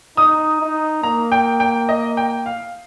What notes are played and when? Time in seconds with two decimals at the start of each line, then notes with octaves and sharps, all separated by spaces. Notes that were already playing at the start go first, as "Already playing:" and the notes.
0.17 D#4 D#6
0.61 D#4
1.03 A#3 A#5
1.32 G5
1.60 G5
1.89 D#5
2.17 G5
2.46 F5